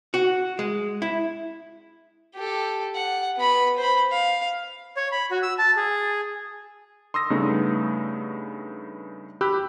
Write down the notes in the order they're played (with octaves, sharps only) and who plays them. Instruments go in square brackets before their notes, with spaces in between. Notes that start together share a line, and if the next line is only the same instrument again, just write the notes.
[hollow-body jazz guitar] F#4
G#3
E4
[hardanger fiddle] G4 A4
F#5
B3 B5
C5 B5
F5
[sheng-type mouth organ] C#5
B5
F#4
E6
A5
G#4
[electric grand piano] C6 D#6 E6 A#6
G2 C#3 A3 B3 D#4
G4 B5 E6 F#6 G6